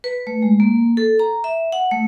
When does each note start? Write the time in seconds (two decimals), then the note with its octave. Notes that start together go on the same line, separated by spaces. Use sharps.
0.04 B4
0.27 A3
0.42 G#3
0.60 A#3
0.97 A4
1.19 A#5
1.44 E5
1.72 F#5
1.91 A3